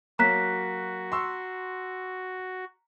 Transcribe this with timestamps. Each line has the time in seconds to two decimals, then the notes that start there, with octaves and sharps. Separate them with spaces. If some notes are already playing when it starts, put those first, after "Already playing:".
0.19 F#3 A#3 F#4 A#5 F#6 B6
1.12 C6 C#6 E6